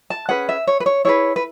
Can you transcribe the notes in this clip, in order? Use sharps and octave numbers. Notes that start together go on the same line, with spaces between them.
A5
C#4 G#4 B4 F#5
E5
C#5
B4
C#5
E4 G#4 B4 C#5
B4